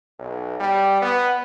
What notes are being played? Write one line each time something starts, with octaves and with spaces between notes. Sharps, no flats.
B1
G3
B3